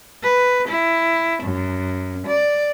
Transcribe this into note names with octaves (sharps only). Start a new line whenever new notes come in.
B4
E4
F#2
D5